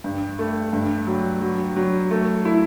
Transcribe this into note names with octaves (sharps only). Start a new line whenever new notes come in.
G2
A3
G2
F#3
F#3
F#3
A3
E4